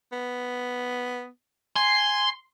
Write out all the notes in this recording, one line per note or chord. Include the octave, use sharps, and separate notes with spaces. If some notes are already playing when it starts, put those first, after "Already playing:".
B3
G#5 C6